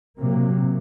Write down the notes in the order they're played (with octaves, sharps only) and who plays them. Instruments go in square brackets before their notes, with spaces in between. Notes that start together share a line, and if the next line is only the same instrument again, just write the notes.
[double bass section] C3 F#3 A#3